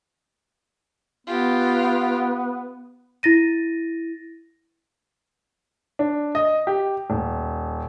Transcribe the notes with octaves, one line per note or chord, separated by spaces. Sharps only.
B3 F4 G4
E4 A6 A#6 D#7
D4
D#5
G4
D#1